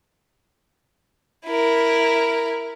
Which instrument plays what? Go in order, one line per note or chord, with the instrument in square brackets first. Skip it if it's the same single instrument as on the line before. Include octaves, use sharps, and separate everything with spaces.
[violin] E4 A#4